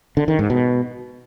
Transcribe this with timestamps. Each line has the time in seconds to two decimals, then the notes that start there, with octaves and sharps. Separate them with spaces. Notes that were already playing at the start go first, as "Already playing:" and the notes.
0.17 D3
0.28 D#3
0.39 G#2
0.50 B2